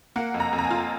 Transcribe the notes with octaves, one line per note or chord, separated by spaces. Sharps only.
A#3 F#5
F2
A#5
F2
A#5
G#5
F4